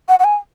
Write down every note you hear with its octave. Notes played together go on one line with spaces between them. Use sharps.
F#5
F#5
G#5